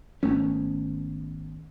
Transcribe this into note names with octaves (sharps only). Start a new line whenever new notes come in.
G#1 A3 B3 C#4